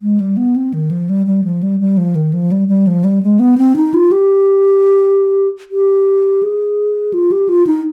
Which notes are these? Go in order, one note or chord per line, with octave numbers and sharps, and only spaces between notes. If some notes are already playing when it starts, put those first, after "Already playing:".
G#3
G3
B3
C4
D#3
F3
G3
G3
F3
G3
G3
F3
D#3
F3
G3
G3
F3
G3
G#3
B3
C4
D#4
F4
G4
G4
G#4
F4
G4
F4
D#4